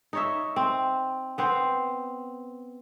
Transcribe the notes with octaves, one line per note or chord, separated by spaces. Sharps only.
D#4 C#5 E5
C4
B3 C4 C5